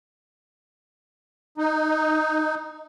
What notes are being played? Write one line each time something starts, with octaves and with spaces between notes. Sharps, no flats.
D#4